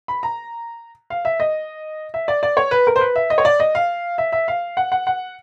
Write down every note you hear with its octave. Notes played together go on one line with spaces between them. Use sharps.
B5
A#5
F5
E5
D#5
E5
D5
D5
C#5
B4
A#4
C5
B4
E5
D#5
C#5
D5
D#5
F5
E5
E5
F5
F#5
F#5
F#5